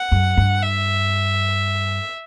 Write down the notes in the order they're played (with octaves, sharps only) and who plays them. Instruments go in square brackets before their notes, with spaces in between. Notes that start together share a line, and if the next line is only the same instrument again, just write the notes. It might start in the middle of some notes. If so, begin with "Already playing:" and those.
Already playing: [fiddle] F#5
[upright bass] F#2
G2
[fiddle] E5